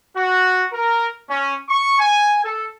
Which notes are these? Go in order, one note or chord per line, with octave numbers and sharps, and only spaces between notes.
F#4
A#4
C#4
C#6
G#5
A4